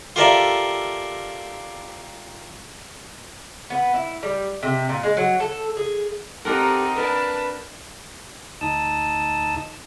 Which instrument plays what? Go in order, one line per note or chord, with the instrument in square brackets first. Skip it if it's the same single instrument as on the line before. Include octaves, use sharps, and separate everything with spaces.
[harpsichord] F4 G4 A4 A#4 D5 E5
[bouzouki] B3
E4
G3
C3
A#2
G#3
F#3
A4
G#4
[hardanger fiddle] C4 D#4 [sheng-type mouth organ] G4 A4 [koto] A#4 F#5
[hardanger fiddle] D4 A5 [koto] A#4 [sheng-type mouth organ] B4 B5
[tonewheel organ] D2 D#4 A5 D#6 E6